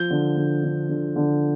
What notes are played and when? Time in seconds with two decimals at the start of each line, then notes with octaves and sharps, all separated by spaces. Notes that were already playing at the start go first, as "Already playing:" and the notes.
Already playing: F3 G6
0.10 D3
0.37 D3
0.63 D3
0.89 D3
1.16 D3